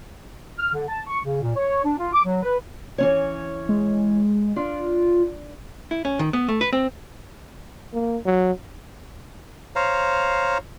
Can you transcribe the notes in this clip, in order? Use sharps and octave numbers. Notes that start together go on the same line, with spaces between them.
F6
D3
A5
C#6
C#3
A#2
C#5
D4
F4
D6
F#3
B4
E3 C#4 C#5
G#3
D4 F4
E4
C#4
D#3
B3
A3
B4
C4
A#3
F#3
C5 C#5 F5 A#5